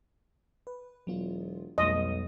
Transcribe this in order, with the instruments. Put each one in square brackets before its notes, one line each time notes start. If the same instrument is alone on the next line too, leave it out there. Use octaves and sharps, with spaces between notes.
[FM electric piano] B4
[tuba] E1 [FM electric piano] F#3 B3 F4
[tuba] B1 [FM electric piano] F2 G3 A3 [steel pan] D#5